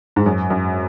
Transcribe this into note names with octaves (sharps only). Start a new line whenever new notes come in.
G#2
F#2
F#2